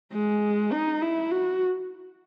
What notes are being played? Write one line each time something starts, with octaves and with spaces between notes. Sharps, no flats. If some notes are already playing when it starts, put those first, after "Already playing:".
G#3
D#4
E4
F#4